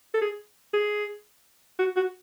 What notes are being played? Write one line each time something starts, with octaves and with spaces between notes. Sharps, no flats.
A4
G#4
G#4
F#4
F#4